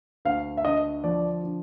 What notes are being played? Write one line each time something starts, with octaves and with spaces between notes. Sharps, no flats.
D2 F5
E5
D3 D#5
F3 D5
D3